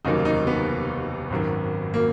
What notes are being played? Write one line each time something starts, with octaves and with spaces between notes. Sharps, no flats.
F1 D#2 C#3 F#3 A#3 D#4
D#4
B3
G#1 F#2 D#3
A#3